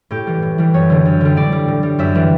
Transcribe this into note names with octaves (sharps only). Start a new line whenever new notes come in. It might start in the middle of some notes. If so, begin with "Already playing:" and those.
A2 G4
E3 G3
A2
E3 G3
F#2 C#5
D3 G3
F#2
D3 G3
A2 D5
G3
A2
G3
F#2 E5
E3 G3